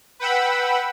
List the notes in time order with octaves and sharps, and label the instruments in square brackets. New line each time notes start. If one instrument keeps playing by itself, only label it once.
[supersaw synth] B4 F#5 G5 B5 E6